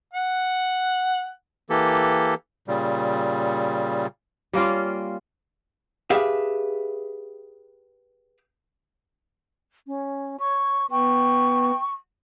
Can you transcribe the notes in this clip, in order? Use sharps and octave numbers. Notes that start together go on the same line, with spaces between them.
F#5
E3 A#3 G4 A4
A#2 C#3 G3
G3 A#3 C#4 F4
G4 G#4 B4 E5 F5
C#4
C#5 C#6
B3 G5 C#6